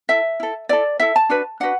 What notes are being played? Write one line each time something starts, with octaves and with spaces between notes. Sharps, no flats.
E4 A4 E5
E4 A4
E4 A4 D5
E4 A4 E5
A5
D4 F#4 B4
D4 F#4 B4 F#5